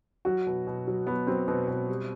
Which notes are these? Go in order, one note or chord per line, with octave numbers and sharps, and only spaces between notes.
F#3 F#4
B2
B2
F#3
F#3 B3
F#3 C4
B2 C4
B2
G3